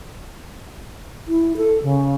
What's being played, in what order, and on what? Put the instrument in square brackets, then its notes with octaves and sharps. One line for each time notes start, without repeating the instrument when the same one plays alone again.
[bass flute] E4
A4
C#3